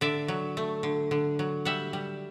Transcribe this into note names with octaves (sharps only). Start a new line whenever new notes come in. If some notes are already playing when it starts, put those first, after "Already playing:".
D3 D5 E5
F#3
A3
D3
D3
F#3
G3 E5 F#5
G3